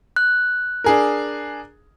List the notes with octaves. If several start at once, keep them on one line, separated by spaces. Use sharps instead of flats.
F#6
D4 G#4 A#4